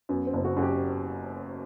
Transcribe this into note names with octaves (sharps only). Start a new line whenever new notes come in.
F#2 B3
C4
F#1
F#4
F#2 F#4
G4